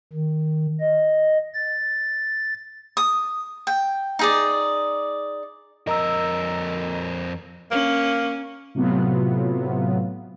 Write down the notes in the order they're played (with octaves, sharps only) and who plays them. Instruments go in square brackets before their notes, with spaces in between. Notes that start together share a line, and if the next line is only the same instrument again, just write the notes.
[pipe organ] D#3
D#5
A6
[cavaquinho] D#6
G5
D#4 G#4 D5
[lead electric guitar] F2 A#4 [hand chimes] D#5 A#5 E6
[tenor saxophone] A#3 [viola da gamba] C#4
[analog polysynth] A2 C3 F#3 B3 F4